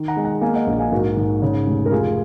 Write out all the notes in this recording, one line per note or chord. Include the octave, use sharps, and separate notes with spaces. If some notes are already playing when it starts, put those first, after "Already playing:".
Already playing: D#3
F#5 A#5
G#3
F#5 A#5
A#3 F5 G#5
D#5 F#5
A#1
F5 G#5
G#2 F#4 A#4
G#2
C#3
F1
A#4
F1 F4 G#4